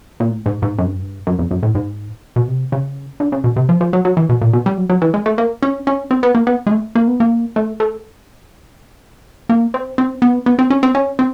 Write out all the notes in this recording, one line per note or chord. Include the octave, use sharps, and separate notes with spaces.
A#2
A2
G#2
G#2
F#2
G2
F#2
G2
F#2
F2
F#2
A2
G#2
B2
C3
C#3
D3
C#3
B2
C3
F3
F3
F#3
F#3
E3
B2
A#2
B2
G3
F#3
F#3
E3
G#3
A3
A#3
C#4
C#4
C4
B3
A#3
B3
G#3
A3
A#3
B3
A#3
A3
A3
A#3
C4
C4
B3
B3
C4
C#4
C4
C#4
C4